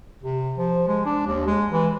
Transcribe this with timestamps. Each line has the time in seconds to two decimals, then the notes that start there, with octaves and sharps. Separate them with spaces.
0.23 C3
0.58 F3
0.87 G#3
1.06 D4
1.27 D#2
1.46 G#3
1.71 E3